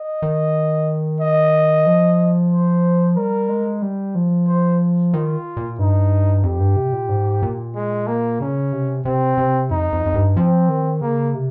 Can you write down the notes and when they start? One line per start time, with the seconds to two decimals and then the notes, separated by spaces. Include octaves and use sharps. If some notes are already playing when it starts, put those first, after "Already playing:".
Already playing: D#5
0.22 D#3
1.20 D#5
1.86 F3
2.51 C5
3.16 G3 A#4
3.49 G#3
3.82 G3
4.15 F3
4.47 C5
5.13 D#3 F4
5.57 A#2
5.79 G2 D#4
6.43 F2 G4
6.60 G2
6.76 C3
6.93 A#2
7.09 G#2
7.42 A#2
7.75 G#3
8.07 A#3
8.40 C#3 C#4
8.72 C3
9.05 C3 C4
9.38 C3
9.71 F2 D#4
9.93 F2
10.06 F2
10.14 G2
10.36 F3 C4
10.69 D#3
11.01 C#3 A#3
11.34 C3